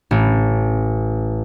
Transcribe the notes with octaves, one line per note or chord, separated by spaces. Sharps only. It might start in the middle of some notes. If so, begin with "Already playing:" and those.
A1